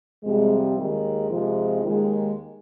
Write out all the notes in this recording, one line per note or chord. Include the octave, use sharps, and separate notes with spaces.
F2 C3 G3 G#3
D#2 D#3 G#3
F2 C3 F3 G#3
D#2 D#3 G#3